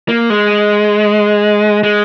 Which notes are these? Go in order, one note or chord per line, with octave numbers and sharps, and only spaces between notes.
A#3
G#3
G#3